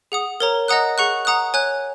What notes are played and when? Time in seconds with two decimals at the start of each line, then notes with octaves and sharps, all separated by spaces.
0.12 G#4 F#5 D#6
0.40 A#4 C#5 A#5
0.68 D#5 F#5 A#5 D#6 F#6
0.98 G#4 F#5 C#6 F#6
1.25 F#5 A#5 D#6 F#6
1.54 C#5 G#5 F#6